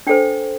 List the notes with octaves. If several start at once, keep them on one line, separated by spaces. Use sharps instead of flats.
D4 A4 C5 G5